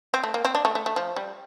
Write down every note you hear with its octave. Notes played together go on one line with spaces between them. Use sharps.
C4
A3
A#3
C4
D4
A3
A3
A3
F3
G3